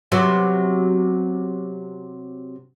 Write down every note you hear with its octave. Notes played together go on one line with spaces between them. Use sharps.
C3 F#3 B3